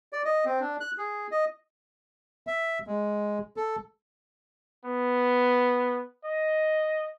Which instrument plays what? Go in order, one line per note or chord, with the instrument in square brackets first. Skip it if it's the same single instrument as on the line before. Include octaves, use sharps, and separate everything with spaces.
[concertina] D5
D#5
C4
D4
F#6
G#4
D#5
[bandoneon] E5
G#3
A4
[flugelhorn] B3
D#5